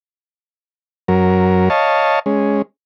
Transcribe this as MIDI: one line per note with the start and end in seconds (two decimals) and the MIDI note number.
1.08 1.69 42
1.08 1.69 54
1.08 1.69 70
1.70 2.19 73
1.70 2.19 75
1.70 2.19 77
1.70 2.19 81
2.26 2.62 56
2.26 2.62 61